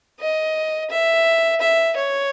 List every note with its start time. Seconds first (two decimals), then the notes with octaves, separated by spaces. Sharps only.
0.20 D#5
0.90 E5
1.61 E5
1.96 C#5